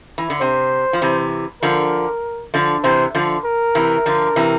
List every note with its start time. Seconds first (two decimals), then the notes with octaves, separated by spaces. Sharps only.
0.18 E3
0.30 D3
0.41 C3 C5
0.93 F3
1.02 C3 E3
1.62 D3 F3 A#4
2.54 D3 F3
2.84 C3 E3 C5
3.15 D3 F3
3.45 A#4
3.75 C3 E3
4.06 D3 F3
4.36 C3 E3